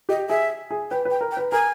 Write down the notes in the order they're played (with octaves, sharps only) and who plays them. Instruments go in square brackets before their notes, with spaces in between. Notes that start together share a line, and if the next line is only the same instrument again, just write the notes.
[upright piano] G4 [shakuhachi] D#5
[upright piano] G#4 [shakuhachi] E5
[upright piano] G#4
[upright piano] B4 [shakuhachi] G5
[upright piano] B4
[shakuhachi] G5
[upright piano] A#4
[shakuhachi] G5
[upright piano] B4
[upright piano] A#4 [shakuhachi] G#5